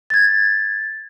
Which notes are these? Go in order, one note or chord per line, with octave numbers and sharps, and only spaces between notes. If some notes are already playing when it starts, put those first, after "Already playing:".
G#6 A6